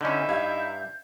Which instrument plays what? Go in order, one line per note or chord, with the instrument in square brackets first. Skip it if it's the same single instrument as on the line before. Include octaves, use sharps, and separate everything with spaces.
[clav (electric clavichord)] D3 C#4 [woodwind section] D#4 E4 [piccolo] G6
[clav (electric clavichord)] G2 [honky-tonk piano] E5 F5 G#6